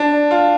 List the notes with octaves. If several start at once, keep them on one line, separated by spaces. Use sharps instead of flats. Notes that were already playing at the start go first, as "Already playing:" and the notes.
Already playing: D4
F4